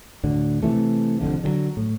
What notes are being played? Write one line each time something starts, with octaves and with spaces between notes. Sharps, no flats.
D2 A2 D3
C3 E3 A3
F1 A#1 F2 D3
D3 E3 F#3
A2